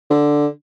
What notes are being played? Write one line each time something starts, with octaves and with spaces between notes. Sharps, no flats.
D3